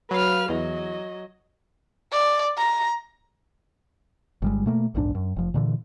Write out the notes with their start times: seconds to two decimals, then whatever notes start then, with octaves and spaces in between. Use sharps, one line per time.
0.11 F#3 B4 F5 F6
0.49 E2 F#3 D#5
2.12 D5
2.57 A#5
4.42 G1 G3 G#3
4.66 B2 A3 A#3
4.95 A#1 E2 G#2 D4
5.15 F#2
5.36 F1 F3
5.54 A#2 D3 E3